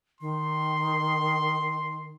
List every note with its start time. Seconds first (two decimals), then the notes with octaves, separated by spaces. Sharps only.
0.21 D#3 C6